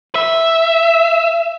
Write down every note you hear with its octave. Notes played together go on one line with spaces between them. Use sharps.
E5